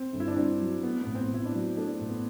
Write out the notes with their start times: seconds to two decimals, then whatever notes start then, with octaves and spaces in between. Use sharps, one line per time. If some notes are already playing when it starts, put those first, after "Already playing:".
Already playing: C4
0.13 G1
0.20 E4
0.28 D4
0.37 G2 C4
0.60 F#3
0.83 A3 B3
1.02 A1 B3
1.15 C4
1.30 A2 E4
1.45 D4
1.54 F#3
1.77 A3 D4
2.00 A1
2.09 B3